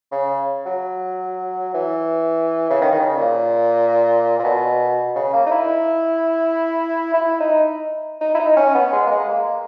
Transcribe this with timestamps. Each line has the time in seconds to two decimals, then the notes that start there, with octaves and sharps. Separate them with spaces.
0.12 C#3
0.66 F#3
1.74 E3
2.70 C#3
2.82 D#3
2.92 D#3
3.00 C#3
3.17 A#2
4.39 A#2
4.44 B2
5.16 C#3
5.33 A#3
5.47 D#4
5.52 E4
7.14 E4
7.41 D#4
8.21 D#4
8.35 E4
8.39 D#4
8.57 C#4
8.75 B3
8.93 G#3
9.07 A#3
9.11 G#3
9.29 A#3